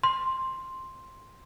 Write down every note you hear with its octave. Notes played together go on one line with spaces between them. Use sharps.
C6